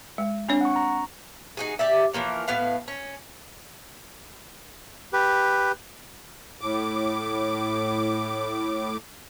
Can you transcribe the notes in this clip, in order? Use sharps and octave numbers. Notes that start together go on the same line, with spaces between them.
G#3
C4 D4 C#5
F#5 C#6
A#5
D#4 F#4 G#4
G4 D5 E5
E3 F3 A#3 C#5
A2 B3 B4 F5
C#4
G4 B4
A2 D6